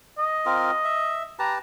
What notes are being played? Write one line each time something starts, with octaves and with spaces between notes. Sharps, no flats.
D#5
C4 F4 A#4
E5
G4 B4 A5 A#5